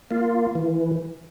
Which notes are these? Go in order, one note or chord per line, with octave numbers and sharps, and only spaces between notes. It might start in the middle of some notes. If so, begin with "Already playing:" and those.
A#3 F4
E3